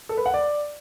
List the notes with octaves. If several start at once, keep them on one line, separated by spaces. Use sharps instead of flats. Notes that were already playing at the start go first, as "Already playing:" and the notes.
A4
B4
F#5
D5